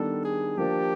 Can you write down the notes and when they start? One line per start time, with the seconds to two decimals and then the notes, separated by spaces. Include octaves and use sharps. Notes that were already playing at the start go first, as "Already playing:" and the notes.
Already playing: D#3 G3 B3 D4 A4
0.25 G#4
0.57 F3 A#3 D4 G4